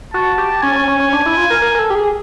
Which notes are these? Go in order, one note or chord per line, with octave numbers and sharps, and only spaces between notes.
F#4 A5
G4
C#4 G#5
C#4
C#4
C#4
D4
E4
F4
A#4
A#4
A#4
A4
G4
G#4